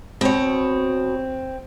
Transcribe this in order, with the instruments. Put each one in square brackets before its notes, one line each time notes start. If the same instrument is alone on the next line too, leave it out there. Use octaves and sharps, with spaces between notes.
[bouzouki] B2 C#5 [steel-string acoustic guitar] C4